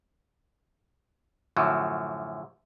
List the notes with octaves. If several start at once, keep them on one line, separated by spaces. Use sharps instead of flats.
F#2 A2 D3 F3 F#3